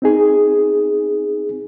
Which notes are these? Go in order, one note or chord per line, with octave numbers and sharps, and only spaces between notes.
C4 D#4 G#4